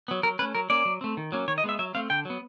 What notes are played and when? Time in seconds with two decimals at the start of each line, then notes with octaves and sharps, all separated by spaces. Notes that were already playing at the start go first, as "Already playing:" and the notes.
0.08 F#3 B3
0.23 F#3 A#4
0.39 C#4 B4
0.42 A3
0.55 F#3 A#4
0.70 A#3 C#4 D5
0.85 F#3
1.01 A3 C4
1.17 D#3
1.32 F#3 A#3 C#4
1.48 D#3 C#5
1.58 D#5
1.64 G#3 B3 E5
1.79 F#3 E5
1.95 A3 C4 F5
2.10 D3 G5
2.25 F#3 B3